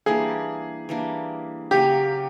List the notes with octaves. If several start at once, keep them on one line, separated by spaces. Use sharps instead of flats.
E3 G3 A#3 D4 G#4
E3 G3 A#3 D4
C#3 F#3 A#3 C#4 G4